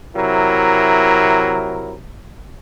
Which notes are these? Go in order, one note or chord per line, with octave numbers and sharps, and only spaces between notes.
C3 F#3 E4 A#4